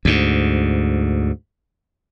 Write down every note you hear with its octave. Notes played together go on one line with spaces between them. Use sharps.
D2 G#2